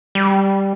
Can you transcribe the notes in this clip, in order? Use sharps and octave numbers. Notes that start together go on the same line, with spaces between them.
G3